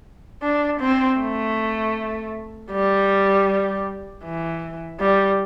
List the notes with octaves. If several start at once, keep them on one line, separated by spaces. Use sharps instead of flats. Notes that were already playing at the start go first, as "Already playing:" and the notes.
D4
C4
A3
G3
E3
G3